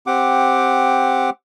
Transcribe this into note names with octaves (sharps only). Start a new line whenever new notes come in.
C4 G4 F#5 D6